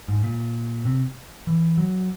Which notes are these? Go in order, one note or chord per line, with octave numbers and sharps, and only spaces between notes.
G#2
A#2
C3
E3
F#3